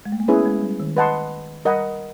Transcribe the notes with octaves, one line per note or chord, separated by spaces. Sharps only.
G#3
A3
A#3
B3 C#4 E4 G#4 B4
G#3
G3
D#3
B4 D#5 F#5 A5 C6
G3 A#4 D#5 F#5 B5